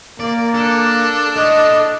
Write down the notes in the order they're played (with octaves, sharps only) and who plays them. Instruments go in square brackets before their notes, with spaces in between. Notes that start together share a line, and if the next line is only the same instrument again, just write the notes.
[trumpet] A#3 [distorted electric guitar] D5
[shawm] D4 [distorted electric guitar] A4
[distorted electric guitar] A4 C#5 [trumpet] D#5